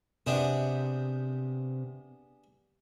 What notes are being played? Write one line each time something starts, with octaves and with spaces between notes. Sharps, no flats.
C3 B3 D4 G#4